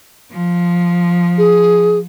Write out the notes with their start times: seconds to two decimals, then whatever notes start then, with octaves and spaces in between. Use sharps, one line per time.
0.31 F3
1.38 G#4